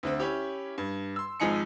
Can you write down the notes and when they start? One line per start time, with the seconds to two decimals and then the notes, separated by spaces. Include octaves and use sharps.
0.03 D2 D3 C4
0.20 C#4 E4 G4
0.78 G2
1.16 C6 E6
1.40 G#1 F3 G#3 D#4 G#5 C#7